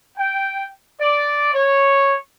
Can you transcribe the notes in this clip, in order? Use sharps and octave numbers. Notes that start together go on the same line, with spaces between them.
G5
D5
C#5